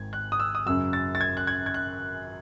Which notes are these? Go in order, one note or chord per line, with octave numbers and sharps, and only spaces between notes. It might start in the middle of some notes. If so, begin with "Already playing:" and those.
Already playing: G#1 G#2 D#3 G#3 G#6
F#6
D#6
E6
D#6
F#2 C#3 F#3 E6
A6
A6
G#6
F#6
G#6
G#6
F#6